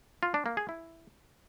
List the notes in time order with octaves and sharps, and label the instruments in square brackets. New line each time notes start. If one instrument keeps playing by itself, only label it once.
[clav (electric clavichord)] F4
D4
A#3
G#4
E4